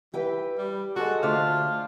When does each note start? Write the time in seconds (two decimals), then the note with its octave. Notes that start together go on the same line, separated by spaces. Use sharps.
0.14 E3 G4 B4 G5
0.58 G3
0.96 G#3 F#4 A4 E6
1.23 D2 D4 F4 C5 D5 E5